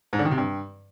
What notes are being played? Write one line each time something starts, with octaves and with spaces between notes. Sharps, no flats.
G#2
D3
D#3
C3
G2